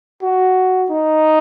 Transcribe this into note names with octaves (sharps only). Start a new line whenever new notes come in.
F#4
D#4